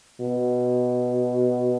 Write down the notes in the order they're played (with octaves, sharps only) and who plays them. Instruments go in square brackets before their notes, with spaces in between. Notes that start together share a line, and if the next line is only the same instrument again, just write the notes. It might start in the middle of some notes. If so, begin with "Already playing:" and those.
[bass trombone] B2